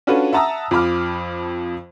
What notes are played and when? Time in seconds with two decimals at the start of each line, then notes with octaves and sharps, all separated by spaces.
0.07 C#4 D4 F4 F#4 A4 B4
0.33 E5 F#5 A5 A#5 D#6 E6
0.71 F2 F3 B5 D6 F6